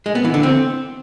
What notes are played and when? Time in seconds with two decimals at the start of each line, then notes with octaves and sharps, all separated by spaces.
0.06 G#3
0.15 B3
0.25 E3
0.34 D3
0.43 C4